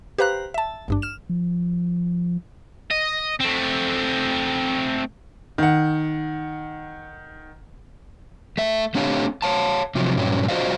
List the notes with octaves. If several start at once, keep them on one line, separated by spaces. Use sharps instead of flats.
G4 B4 C5 F5 A#5 F#6
E5 A5
G#1 G2 D4
F6 E7
F3
D#5
A3 C4
D#3 F#5
A3 E5
A3 C4 D4 G4 C#5 F5
C#5 F5 A5
C3 F3 F#3
G2 A#2 F#3 G3 C#4
F4 F#4 C5 D5 D#5 F5